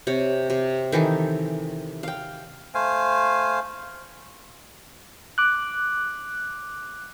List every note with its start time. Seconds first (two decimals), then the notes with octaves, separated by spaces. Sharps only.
0.07 C3 C#5
0.50 C3
0.92 D#3 E3 D#4 A4
2.03 F5 G5
2.75 A3 C5 F5 G#5
5.38 D6 F#6